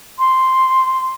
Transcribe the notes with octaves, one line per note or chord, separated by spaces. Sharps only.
C6